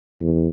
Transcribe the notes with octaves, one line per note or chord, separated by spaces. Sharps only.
E2